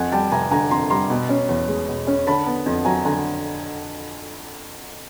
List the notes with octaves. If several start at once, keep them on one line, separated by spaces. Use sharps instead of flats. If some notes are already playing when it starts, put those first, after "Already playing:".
Already playing: F2 F#5 G#5
G3 G5 A5
F1 G#5 A#5
D3 G#5 A#5
F2 A#5 C6
G3 A#5 C6
B2
C#4
E2
G#3
B2
C#4
D3 A5 B5
B3
F2
F#3 G#5 A#5
D3 G#5 A#5